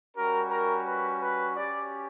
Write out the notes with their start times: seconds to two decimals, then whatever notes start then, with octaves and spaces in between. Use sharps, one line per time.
0.16 G3 C#4 F#4 A#4
0.51 A#4
0.86 B4
1.21 B4
1.57 C#4 G4 D5